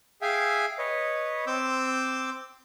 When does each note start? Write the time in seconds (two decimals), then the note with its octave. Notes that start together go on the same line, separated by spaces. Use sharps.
0.22 G#4 E5 F5 G5 G#5
0.78 B4 C#5 D#5
1.47 C4 D6 E6 G6